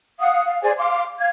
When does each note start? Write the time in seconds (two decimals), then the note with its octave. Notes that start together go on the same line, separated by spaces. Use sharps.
0.20 F5 F#5 D#6
0.46 F5
0.62 G#4 C5 D5 G#5
0.78 F5 C6 D6
1.18 F5 G#6